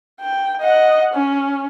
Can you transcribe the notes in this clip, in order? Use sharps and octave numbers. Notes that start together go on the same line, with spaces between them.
G5
D#5 F#5
C#4